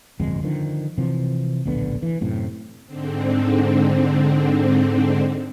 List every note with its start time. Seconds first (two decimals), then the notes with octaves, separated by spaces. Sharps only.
0.20 D1 G1 F2 G#3
0.43 D3 D#3 F3
0.98 C3 E3 F3
1.66 D1 A#1 D3 B3
2.02 E3
2.21 F#2 A2 C3
2.86 G#2 D3 C4